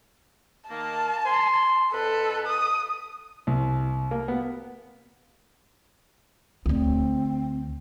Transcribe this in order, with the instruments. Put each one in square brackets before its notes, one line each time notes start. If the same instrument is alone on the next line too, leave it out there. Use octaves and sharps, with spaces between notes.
[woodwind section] D#3 A#3 [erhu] A5
[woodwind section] C6
[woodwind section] F2 B4 [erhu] A4
[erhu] D#6
[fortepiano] C2
A#3
B3
[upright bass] D2 D3 [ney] C4